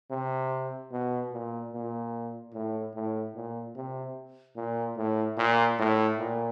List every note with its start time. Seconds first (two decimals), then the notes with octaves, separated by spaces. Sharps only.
0.11 C3
0.92 B2
1.32 A#2
1.73 A#2
2.54 A2
2.95 A2
3.35 A#2
3.76 C3
4.56 A#2
4.97 A2
5.38 A#2
5.79 A2
6.19 A#2